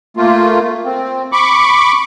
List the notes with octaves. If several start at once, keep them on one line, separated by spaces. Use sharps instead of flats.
A3 A#3 F4
C4
B5 C#6 D6